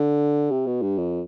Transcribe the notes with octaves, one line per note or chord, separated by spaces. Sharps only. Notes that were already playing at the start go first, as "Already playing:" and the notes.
Already playing: D3
C3
B2
G2
F2